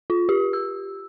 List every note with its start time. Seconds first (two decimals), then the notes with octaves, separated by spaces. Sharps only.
0.10 F4
0.29 G4
0.53 E6